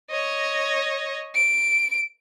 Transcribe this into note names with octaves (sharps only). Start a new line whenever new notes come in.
C#5 D#5
D7